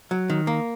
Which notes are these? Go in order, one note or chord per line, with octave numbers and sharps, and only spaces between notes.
F#3
D#3
A#3